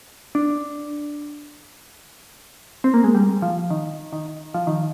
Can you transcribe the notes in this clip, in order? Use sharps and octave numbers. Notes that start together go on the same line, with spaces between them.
D4
C4
A#3
G#3
G3
F3
D#3
D#3
F3
D#3